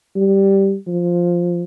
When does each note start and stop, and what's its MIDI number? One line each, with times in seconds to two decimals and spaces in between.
0.16 0.75 55
0.87 1.64 53